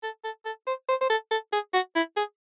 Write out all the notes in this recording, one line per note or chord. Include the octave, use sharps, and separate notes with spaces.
A4
A4
A4
C5
C5
C5
A4
A4
G#4
F#4
E4
G#4